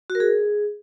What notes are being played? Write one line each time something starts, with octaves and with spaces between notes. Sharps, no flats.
F#4
A#4
G#4